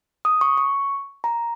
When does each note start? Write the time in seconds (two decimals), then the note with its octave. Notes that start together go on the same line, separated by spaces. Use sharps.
0.25 D#6
0.41 C#6
0.57 C#6
1.24 A#5